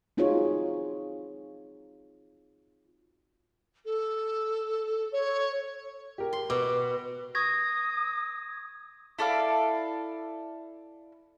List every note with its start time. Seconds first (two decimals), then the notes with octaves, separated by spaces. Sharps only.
0.17 C4 D#4 F4 F#4 G#4 C#5
3.85 A4
5.12 C#5
6.18 G4 A#4
6.33 C6
6.50 B2 D6
7.35 C#6 D#6 G#6 A#6
9.19 E4 A4 D5 F5